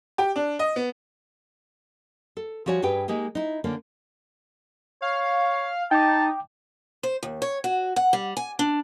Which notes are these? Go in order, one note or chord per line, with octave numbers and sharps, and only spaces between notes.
G4
D4
D#5
B3
A4
F3 G3 F#4 C#5 G#5
G2 G4 G#4 B4 G5
G#3 A#3 D#4 G4
D#4 E4
D3 A#3 C#4
C#5 F5
D#4 G5 A5 D6
C5
D#2
C#5
F#4
F#5
G3
G#5
D4